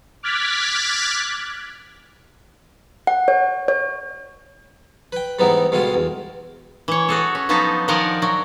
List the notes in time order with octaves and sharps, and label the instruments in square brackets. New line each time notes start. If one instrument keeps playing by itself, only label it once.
[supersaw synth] D6 F6 F#6 G#6 A6 B6
[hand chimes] F#5
C#5
C#5
[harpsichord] B4 G5
G#2 E3 G3 B3 D#4
B2 D3 G3 G#3 F4
E2
[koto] E3 C#5
F#4 G#4 A4
C#4
F3 F#3 B3 D#4 A4
D#3 F3 A#4 D5 F#5 G#5
F#3